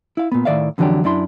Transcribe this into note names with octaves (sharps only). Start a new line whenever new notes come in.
E4 F5
A#2 B3
A2 D#3 D5 E5 F5
F2 D3 E3 F#3 D4 G4
F#2 D4 E4 C6